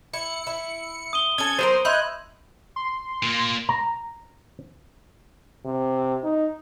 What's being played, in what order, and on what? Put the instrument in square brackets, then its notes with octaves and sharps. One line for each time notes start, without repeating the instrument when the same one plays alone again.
[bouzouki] E4 [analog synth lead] C#7
[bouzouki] E4
[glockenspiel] D#6 D#7 G7
[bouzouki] C#4 A4 [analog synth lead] G#6
[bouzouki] F#3 B3 A#4 [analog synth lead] C5 [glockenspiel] D#7
[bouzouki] D#4 E5 [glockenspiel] B5 C6 G#6 [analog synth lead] F#6
[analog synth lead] C6
[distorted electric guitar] A#2 A#3
[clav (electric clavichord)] A#5
[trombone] C3
D#4